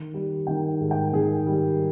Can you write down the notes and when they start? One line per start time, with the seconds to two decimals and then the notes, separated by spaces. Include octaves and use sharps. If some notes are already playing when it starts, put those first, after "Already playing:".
Already playing: D#3
0.14 G3
0.47 D#3 G5
0.81 G#2
0.91 G5
1.13 D#3 G#4
1.46 G3